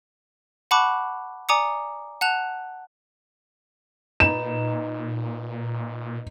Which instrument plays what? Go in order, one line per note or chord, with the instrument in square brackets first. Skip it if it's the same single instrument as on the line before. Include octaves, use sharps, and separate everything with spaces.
[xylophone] F#5 A5 B5 C#6 D6 F#6
D5 G#5 A#5 D6 D#6 C#7
F#5 A5 F#6 F7
[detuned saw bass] A#2 [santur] D#4 B4 [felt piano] E7